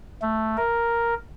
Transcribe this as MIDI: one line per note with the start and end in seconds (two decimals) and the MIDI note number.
0.22 0.57 57
0.57 1.14 70